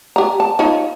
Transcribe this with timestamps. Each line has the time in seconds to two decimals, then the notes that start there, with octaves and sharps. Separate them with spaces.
0.16 G4 A#5
0.40 A5
0.59 D#4 F4 C#5